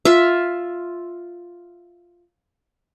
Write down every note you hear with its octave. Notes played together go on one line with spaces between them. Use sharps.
F4 E5